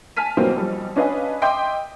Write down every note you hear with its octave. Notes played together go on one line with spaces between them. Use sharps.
G#5 A5 F6 B6 D#7
B2 E3 F#3 G3 A#3 C4
B1 F3 G3
C#4 D4 B4 D#5 F5 G#5
D#5 E5 G5 C6 D6 G6